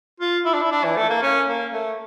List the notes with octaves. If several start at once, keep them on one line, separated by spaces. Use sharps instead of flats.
F4
E4
D4
E4
D4
E3
A3
A#3
C#4
A#3
A3